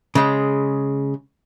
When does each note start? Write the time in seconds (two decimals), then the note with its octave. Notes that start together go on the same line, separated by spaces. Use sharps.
0.15 C#3 G#3